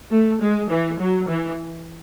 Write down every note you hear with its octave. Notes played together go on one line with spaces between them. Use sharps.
A3
G#3
E3
F#3
E3